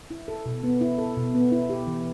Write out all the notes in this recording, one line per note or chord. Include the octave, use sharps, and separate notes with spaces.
E4
A4
B2
B3
E4
A4
B2
B3
E4
G4
E3